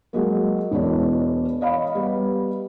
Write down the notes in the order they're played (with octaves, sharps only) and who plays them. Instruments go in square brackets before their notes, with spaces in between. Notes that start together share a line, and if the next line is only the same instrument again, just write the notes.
[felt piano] F#3 G#3 A#3
E1 E3 G#3 D4 C#5 D5
C#5 D#5 F5 B5
G3 B3